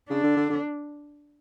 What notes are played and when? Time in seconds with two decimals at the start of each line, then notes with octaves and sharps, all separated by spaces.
0.10 C#3 D4
0.23 D3
0.36 D3
0.50 D3